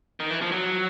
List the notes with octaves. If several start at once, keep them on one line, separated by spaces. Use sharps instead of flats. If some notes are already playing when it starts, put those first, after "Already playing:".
D#3
E3
F3
F#3